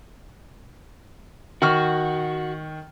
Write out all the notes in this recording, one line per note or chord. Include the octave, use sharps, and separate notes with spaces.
D#3 F#4 C#6 F6